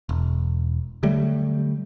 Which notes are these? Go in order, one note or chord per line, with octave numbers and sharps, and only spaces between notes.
E1
D3 F#3 G3 A3